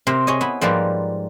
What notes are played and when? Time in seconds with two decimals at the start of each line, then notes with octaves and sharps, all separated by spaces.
0.07 C3 A#4 C5 A#5
0.27 G#4 C#5 D#5
0.41 B3 E4 B5
0.61 G#2 F3 G3 A#3 B4